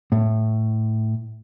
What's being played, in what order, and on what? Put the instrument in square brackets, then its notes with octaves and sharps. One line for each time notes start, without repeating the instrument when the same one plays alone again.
[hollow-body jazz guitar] A2